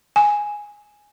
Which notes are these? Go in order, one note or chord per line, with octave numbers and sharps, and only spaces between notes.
G#5